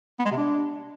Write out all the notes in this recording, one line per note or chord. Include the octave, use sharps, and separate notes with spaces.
B3
G#3
C3
D4